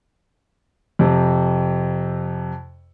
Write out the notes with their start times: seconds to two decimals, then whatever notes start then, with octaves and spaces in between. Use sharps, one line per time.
0.99 F2 C3